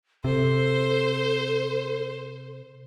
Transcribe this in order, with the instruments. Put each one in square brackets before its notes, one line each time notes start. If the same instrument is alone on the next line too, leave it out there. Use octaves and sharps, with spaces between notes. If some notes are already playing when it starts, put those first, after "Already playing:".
[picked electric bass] C3 [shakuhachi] A4 [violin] C5